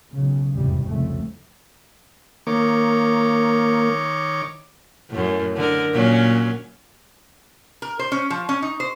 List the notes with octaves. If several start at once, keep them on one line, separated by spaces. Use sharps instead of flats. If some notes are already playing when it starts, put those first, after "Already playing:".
B1 C#3
F1 E2 G#2 C3 G3
C2 F2 C#3 A3
D#3 A#3 C#5 D6
F#2 A2
D3 A#4
A#2 F#3 C#4
A#4
C5
C#4
F3
C#4
D#4
C5